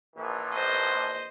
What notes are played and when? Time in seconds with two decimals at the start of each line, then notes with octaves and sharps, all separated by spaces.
0.16 A#1 E3
0.54 C5 D#5